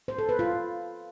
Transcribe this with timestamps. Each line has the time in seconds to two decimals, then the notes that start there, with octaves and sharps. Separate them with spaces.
0.08 C5
0.18 A4
0.29 B4
0.39 F4